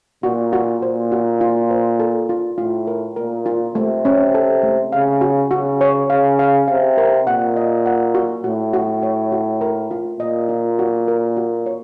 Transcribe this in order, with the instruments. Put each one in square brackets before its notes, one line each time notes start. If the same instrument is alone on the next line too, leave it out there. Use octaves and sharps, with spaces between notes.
[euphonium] A#2 [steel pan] F#4
[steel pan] F#4
[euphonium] A#2 [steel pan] C5
[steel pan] F#4
F4
C5
A4
F4
[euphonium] A2 [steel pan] F4
[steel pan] A#4
[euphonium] A#2 [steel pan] A#4
[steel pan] F4
[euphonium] C3 [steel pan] A3
[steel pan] C#4
A4
A3
[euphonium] C#3 [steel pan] F5
[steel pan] F#4
[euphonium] C#3 [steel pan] F#4
[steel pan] C#5
[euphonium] C#3 [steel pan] F5
[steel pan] F5
[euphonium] C3 [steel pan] F5
[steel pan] A#4
[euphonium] A#2 [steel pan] F#5
[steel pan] D#5
F#5
F#4
[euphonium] A2 [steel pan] F#4
[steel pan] F#4
C#5
F#4
A#4
F4
[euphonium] A#2 [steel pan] D#5
[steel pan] F4
F#4
A#4
F#4
C#5